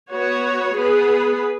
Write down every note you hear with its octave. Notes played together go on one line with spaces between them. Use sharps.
B3 F#4 C#5
B3 G#4 B4